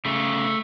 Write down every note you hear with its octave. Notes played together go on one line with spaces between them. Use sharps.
C#3 A3